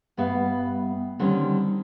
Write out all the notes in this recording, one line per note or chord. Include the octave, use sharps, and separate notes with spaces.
G2 B3 E5 F5
D3 D#3 G3 C4 C#4